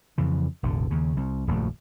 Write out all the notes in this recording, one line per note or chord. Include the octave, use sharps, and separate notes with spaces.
F2 C#3 E3
E1 A1 E2 D3
D#2 C#3
C2
D#1 A#1 F#2 A3